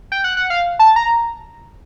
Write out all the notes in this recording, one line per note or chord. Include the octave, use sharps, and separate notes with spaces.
G5
F#5
F#5
F5
A5
A#5